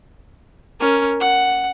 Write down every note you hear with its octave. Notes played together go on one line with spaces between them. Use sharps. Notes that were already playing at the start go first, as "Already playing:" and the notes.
C#4 A#4
F#5